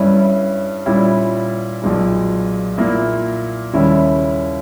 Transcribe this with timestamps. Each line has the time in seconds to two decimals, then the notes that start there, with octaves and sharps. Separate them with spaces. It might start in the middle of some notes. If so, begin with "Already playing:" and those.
Already playing: G2 G3 C#4 E4
0.86 A#2 G3 C#4 E4
1.82 B1 A#2 G#3
2.78 A#2 A#3 E4
3.73 D#2 C#3 G3 C#4 E4